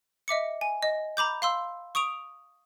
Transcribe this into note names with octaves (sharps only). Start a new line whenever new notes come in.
D#5 E5 D6 C#7
G#5
D#5
A#5 B5 D6 G6
F5 C6 E6
C#6 D#6 D7 F7